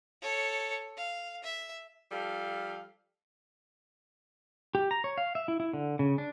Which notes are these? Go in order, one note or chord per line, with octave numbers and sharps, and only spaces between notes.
A4 C#5
F5
E5
F3 G3 A4 F5
G4
A#5
C#5
F5
E5
E4
E4
D3
C#3
D4